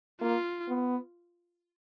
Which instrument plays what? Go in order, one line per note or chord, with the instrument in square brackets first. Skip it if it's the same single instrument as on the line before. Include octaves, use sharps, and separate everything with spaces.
[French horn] A#3 [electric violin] F4
[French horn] B3